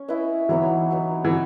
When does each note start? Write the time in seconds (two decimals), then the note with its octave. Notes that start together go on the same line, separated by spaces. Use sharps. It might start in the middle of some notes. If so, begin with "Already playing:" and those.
Already playing: C#4
0.08 E4 B4 D#5
0.49 E3 F#3 B3 D#4
0.91 F#3 B3 D#4
1.25 E3